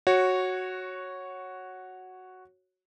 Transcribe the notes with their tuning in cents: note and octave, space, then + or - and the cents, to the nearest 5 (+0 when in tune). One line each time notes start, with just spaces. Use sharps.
F#4 +0 C#5 -10